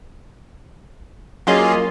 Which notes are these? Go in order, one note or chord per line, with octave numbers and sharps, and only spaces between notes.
F#3 A#3 C#4 F4 G#4 D#5